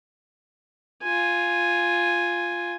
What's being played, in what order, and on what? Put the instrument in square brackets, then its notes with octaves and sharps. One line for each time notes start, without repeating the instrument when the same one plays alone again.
[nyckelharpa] F4 G#5